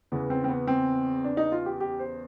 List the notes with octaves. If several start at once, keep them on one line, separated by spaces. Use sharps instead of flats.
E2 C#3 E3 B3
C4
C4
B3
C4
D4
D#4
F4
G4
G4
C5